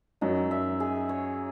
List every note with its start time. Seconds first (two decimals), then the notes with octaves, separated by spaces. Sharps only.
0.21 F#2 F#3 D#4
0.51 E5
0.80 G#4
1.09 C#5